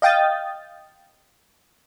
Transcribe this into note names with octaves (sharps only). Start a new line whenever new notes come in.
D#5 F5 G5 D#6 A6